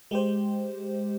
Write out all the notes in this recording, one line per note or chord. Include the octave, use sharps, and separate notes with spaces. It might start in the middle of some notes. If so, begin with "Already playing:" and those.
G#3 G4 C5